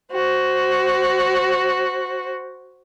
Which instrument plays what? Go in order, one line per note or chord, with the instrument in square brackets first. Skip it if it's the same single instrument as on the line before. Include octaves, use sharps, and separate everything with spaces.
[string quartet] F#4 C5